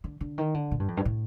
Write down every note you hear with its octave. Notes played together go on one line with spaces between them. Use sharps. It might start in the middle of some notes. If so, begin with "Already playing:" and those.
D3
D3
D#3
D3
A#2
G2
F2
G2
A2